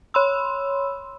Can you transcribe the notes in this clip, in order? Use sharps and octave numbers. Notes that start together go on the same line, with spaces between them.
C#5 B5 C6 E6